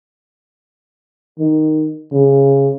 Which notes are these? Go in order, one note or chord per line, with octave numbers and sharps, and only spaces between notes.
D#3
C#3